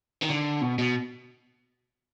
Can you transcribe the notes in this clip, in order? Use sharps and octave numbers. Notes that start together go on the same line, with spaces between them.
D#3
D3
B2
B2